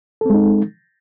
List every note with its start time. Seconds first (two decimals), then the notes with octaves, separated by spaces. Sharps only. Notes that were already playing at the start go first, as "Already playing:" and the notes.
0.21 A4
0.25 C4
0.30 G#3
0.34 D#4